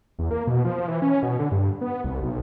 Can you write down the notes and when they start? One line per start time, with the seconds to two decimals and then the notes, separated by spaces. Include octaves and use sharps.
0.19 E2
0.31 A#3
0.47 B2
0.65 F3
0.88 E3
1.02 C#4
1.23 B2
1.39 D3
1.52 G2
1.81 B3
2.04 C2
2.22 B1